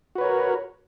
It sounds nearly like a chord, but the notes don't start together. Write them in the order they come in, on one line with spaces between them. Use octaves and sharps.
F#4 B4 C#5 A#4